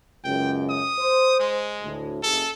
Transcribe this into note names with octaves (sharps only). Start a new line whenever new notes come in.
C#2 F#2 G5
D#6
C5
G#3
D2 A2
F#1 G#4 A4